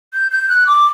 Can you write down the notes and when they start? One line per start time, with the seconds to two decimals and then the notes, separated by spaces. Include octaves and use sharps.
0.14 G6
0.32 G6
0.49 F#6
0.67 D6